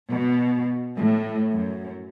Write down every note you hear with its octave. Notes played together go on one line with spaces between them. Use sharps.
B2
A2
F#2